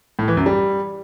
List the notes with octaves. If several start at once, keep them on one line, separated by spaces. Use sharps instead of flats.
A2
E3
F#2
G3